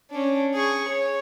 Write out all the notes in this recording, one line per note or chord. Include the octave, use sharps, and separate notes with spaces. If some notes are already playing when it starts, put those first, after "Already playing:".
C#4 D4
G#4 C#6
C#5